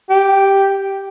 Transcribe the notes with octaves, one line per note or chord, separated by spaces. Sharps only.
G4